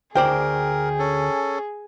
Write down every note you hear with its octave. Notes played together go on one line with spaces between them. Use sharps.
D2 G#4 A#4 C5 D5 G5
C#4 A4